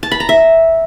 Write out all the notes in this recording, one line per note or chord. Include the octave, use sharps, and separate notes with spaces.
A5
B5
A#5
E5